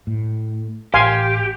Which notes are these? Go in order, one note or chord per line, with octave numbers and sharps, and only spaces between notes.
A2
A1 G4 F5 G#5 C6